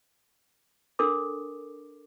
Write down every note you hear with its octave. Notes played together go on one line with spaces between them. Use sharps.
D4 A4 A#4 D6